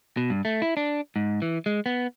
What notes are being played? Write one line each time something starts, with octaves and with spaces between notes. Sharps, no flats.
B2
G2
A3
E4
D4
G#2
E3
G#3
B3